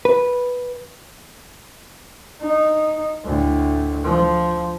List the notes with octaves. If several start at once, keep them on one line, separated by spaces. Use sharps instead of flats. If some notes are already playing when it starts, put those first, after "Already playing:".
B4
D#4
D2 A2
F3